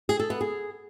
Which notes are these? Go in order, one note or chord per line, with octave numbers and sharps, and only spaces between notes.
G#4
A4
B3
G#4